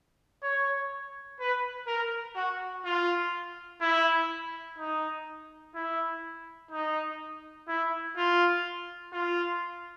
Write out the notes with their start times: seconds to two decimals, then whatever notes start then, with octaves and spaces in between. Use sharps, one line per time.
0.43 C#5
1.40 B4
1.87 A#4
2.35 F#4
2.85 F4
3.81 E4
4.78 D#4
5.75 E4
6.71 D#4
7.68 E4
8.17 F4
9.13 F4